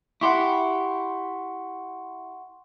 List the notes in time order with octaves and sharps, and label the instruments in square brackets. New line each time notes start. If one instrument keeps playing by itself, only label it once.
[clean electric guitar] E4 G4 [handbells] F#5 C6 C#6